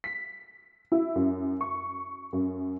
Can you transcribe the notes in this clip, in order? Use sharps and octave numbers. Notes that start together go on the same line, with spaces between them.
B6
E4
F#2
C#6
F#2